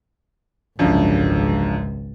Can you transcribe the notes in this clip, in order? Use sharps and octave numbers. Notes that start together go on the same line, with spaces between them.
G#1 C#2 F#2 D3 F3